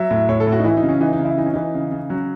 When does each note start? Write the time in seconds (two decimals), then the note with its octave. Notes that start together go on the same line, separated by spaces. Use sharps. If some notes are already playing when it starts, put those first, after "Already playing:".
Already playing: F#3 E5
0.11 A2
0.29 A2 C#5
0.40 A4
0.47 A2
0.52 F#4
0.60 D#4
0.64 E3 E4
0.77 D#4
0.83 C#3
0.89 C#4
1.01 E3 D#4
1.13 D#4
1.19 C#3
1.25 E4
1.38 E3 D#4
1.46 C#4
1.53 E3 D#4
1.74 C#3
1.91 C#3
2.09 F#3 C#4